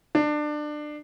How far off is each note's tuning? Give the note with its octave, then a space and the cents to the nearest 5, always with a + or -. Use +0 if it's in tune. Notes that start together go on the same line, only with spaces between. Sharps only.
D4 +25